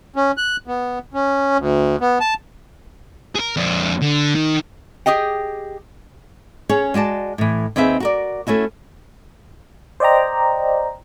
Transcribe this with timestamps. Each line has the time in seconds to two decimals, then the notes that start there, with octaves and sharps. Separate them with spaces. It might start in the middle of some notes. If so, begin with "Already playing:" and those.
0.16 C#4
0.38 F#6
0.67 B3
1.14 C#4
1.58 D2
2.01 B3
2.21 A5
3.36 G#4 A#4
3.57 F2 D4
4.02 D3
4.35 D#3
5.06 G4 G#4 D#5 G5
6.69 C#4 G#4 C#5
6.94 G#3 F#4 D5 A5
7.38 A2 E3
7.76 D#2 C4 G#4 B4 E5
8.00 F#4 A#4 D5
8.47 A3 C#4 E4 F#4
10.00 C5 D5 D#5 G5 A#5